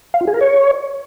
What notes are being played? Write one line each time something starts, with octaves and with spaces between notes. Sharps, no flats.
F5
F4
G#4
A#4
C#5